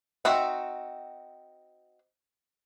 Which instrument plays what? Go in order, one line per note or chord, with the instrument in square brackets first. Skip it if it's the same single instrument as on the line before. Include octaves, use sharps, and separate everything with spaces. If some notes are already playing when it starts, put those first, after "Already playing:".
[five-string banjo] C4 D#4 F#4 E5